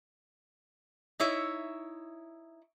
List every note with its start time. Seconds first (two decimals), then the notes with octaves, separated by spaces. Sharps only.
1.20 D#4 E4 C#5 E5